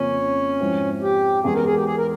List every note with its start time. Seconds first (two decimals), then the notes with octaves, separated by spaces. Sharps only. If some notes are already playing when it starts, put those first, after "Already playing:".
Already playing: F2 C#3 F3 A#3 C#4
0.60 G#2 F3 C4 E4
1.02 G4
1.44 E2 E3 G#3 G#4
1.55 A#4
1.65 G#4
1.75 G4
1.86 G#4
1.97 A#4